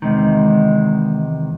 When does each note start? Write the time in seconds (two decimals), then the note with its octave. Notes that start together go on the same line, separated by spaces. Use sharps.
0.02 E2 C3 D#3 G#3